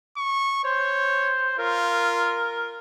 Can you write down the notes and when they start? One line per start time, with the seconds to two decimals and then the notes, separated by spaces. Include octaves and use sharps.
0.17 C#6
0.65 C5 C#5
1.58 F4 A#4